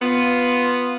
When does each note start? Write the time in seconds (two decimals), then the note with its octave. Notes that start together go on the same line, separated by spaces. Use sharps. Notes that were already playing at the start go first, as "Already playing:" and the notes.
0.01 B3 F4